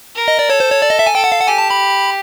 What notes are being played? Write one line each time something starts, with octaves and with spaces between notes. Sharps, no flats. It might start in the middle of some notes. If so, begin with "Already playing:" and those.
A#4
D#5
D5
A4 C#5
C5
C#5
D5
D#5
E5
G#5
A4 G5
F#5
F5
F#5
G4 G#5
A5
B5